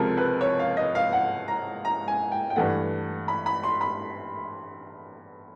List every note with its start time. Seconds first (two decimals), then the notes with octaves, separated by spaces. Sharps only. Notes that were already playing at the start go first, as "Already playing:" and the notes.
Already playing: C#2 C3 F3 G#3 C4 A4 A#4
0.17 B4
0.41 C#5
0.59 F5
0.77 D#5
0.95 F5
1.13 F#5
1.48 A#5
1.85 A#5
2.08 G#5
2.32 G5
2.50 G5
2.56 G2 E3 A3 F#5
3.28 B5
3.46 B5
3.63 C6
3.81 B5